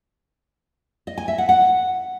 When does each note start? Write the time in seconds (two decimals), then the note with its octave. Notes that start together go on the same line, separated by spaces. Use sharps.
1.07 D#5
1.18 G#5
1.28 E5
1.38 F#5
1.49 F#5